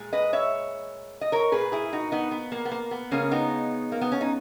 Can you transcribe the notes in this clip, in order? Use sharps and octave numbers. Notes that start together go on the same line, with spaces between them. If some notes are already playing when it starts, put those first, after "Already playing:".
Already playing: A#2 G#3
B4 D#5
C#5 E5
D#5
A#4 C#5
A#2 A#3 G#4 B4
E4 G#4
D#4 F#4
B3 D#4
B3
A#3
B3
A#3
B3
C#3 G#3 A#3 C#4
B3 D#4
A#3
B3
C#4
D#4